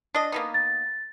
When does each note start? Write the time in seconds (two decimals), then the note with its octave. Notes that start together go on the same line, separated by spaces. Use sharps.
0.15 D4 D#5
0.32 A#3 B3 D#4
0.54 A6